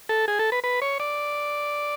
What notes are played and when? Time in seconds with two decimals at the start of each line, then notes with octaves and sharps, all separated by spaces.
0.09 A4
0.28 G#4
0.39 A4
0.52 B4
0.64 B4
0.82 C#5
1.00 D5